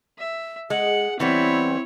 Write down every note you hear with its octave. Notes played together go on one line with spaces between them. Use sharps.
E5
G#3 G#4 F#5
E3 G3 B3 C4 E4 C#5